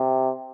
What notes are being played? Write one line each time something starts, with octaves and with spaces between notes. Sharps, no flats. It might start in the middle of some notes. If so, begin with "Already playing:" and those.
Already playing: C3